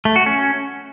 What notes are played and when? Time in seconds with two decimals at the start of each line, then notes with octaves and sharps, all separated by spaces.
0.05 A3
0.16 F#4
0.26 C#4